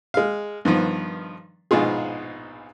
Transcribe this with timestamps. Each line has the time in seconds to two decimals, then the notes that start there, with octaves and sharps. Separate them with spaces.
0.14 G#3 F5
0.65 G2 D#3 F3 B3
1.71 A#1 G#2 B2 F4 G#4